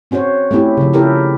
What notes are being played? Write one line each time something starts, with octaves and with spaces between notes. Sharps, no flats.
C4 C#4 F#4 C5 C#5
A3 C4 C#4 E4 G4
C#3 F3
C#4 E4 G4 A4 A#4